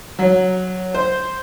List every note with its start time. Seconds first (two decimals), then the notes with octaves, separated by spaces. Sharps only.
0.19 F#3
0.95 C5